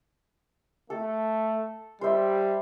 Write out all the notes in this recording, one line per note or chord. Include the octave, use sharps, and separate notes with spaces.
A3 A4
G3 C5 E5